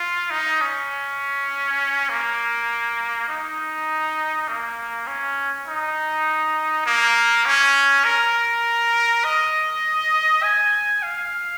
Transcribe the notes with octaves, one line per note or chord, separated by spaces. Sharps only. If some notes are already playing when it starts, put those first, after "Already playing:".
Already playing: F4
D#4
C#4
A#3
D#4
A#3
C#4
D#4
A#3
C#4
A#4
D#5
G#5
F5